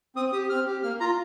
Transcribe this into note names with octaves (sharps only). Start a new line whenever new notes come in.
C4 D#6
G4 D#6
C4 F6
G4
A#3 F6
F4 A#5